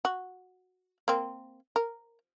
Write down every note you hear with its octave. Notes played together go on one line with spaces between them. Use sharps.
F#4
A#3 C4
A#4